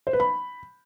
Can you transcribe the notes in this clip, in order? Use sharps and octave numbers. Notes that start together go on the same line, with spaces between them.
C5
B4
B5